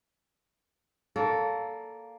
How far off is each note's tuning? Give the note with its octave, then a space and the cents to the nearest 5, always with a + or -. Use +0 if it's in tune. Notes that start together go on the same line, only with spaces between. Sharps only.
A#3 +0 A4 +0 D5 -45